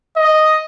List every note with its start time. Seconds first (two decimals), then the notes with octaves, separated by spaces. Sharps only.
0.16 D#5